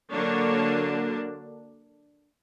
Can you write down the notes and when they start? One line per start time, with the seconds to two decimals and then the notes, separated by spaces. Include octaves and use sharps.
0.12 D3 F#3 A#3 D4 C#5